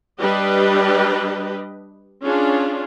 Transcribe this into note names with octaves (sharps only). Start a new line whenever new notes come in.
G3 D4 G4 B4 D#5
C#4 D4 F4 G#4